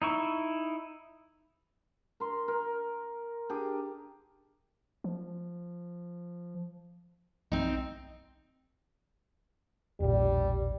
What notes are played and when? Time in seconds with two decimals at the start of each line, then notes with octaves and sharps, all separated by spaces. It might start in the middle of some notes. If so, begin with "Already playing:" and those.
0.02 D#4 E4 C#6
2.20 A#4 C6
2.48 A#4
3.49 D4 G4 G#4
5.04 F3
7.52 B1 C4 D#4
10.00 E1 A#1 G3